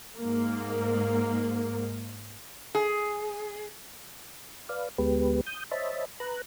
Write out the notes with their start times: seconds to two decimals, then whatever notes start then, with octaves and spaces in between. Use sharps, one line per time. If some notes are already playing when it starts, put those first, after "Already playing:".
0.17 G#2 A#3
2.75 G#4
4.69 B4 D5 F5
4.98 D2 G#3 B3 G4 B4
5.47 D#6 G6
5.71 C5 C#5 D#5 E5 A5 B5
6.20 B4 A#5 F#6